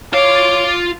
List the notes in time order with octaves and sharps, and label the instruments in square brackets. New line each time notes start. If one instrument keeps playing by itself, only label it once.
[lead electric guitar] F4 F5 [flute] C#5 [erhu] D6